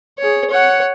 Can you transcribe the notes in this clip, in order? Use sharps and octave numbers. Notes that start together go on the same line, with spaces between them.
G#4 C#5
C#5 F#5